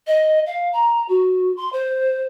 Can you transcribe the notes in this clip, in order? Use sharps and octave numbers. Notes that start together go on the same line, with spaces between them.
D#5
F5
A#5
F#4
C6
C5